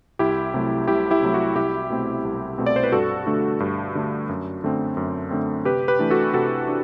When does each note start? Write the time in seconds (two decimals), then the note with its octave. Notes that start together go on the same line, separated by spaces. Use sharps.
0.19 C2 E4 G4
0.54 C3 F#3 A3
0.88 C2 E4 G4
1.11 E4 G4
1.22 C3 F#3 A3
1.34 F#4
1.56 C2 E4 G4
1.90 B2 A3 C4
2.25 C2
2.58 B2 A3 C4
2.66 D5
2.76 C5
2.83 B4
2.92 G2 F#4 A4
3.26 D3 A3 D4
3.60 G2
3.95 D3 A3 D4
4.29 F#2
4.64 D3 A3 C4
4.97 F#2
5.31 D3 A3 C4
5.65 C3 G4 B4
5.88 G4 B4
5.99 E3 A3 D4
6.10 F#4 A4
6.34 C3 F#4 A4
6.68 D4